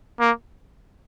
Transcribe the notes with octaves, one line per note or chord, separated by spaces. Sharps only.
A#3